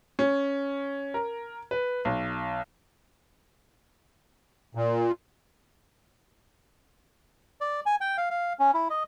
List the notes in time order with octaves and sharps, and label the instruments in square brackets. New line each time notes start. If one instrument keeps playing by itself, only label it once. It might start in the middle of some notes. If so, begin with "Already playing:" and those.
[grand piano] C#4
A#4
B4
B1
[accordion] A#2
[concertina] D5
G#5
G5
F5
F5
C#4
E4
D#5